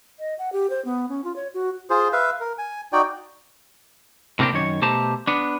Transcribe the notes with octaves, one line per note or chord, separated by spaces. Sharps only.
D#5
F#5
G4
C5
B3
C#4
F4
C#5
F#4
F4 G#4 C5
B4 E5 F5
A#4
G#5
D#4 F#4 D5 G5
A2 C3 A#3 C4 D4 G4
F#2 D#3 C#5
B2 A3 G4 C5 A5 A#5
B3 D4